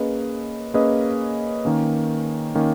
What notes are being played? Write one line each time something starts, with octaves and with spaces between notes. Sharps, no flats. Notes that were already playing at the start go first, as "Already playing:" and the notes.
Already playing: A#3 C#4 G#4 B4 D#5
A#3 C#4 G#4 B4 D#5
D#3 A#3 C#4
D#3 A#3 C#4